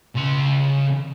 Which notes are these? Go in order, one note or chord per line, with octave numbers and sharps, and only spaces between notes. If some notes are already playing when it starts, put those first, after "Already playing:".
C#3 C6